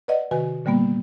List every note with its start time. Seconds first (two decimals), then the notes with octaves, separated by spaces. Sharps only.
0.08 B4 D5 D#5 F#5
0.31 C3 D#3 F#4 B4 G#5
0.65 A#2 D3 G3 A#3 B3